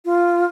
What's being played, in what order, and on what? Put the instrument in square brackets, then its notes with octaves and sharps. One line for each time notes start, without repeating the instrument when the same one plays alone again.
[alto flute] F4